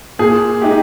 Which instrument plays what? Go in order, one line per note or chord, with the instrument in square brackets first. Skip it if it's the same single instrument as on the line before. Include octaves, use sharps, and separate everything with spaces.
[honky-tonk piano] A#2 [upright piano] G#4
[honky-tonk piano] G#3 D#4 G4